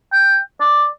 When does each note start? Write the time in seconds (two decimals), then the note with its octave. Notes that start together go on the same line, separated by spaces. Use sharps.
0.12 G5
0.60 D5